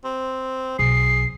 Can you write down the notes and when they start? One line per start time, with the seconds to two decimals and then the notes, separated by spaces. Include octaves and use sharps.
0.04 C4
0.79 B1 G#4 C7